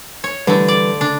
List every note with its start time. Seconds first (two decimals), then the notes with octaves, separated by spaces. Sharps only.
0.24 C#5
0.47 D3 E3 G3 A3 B4
0.68 D5
1.01 C#3 D4